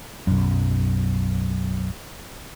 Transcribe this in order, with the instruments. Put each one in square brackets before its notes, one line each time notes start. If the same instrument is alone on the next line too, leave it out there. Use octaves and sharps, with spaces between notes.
[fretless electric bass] B1 F#2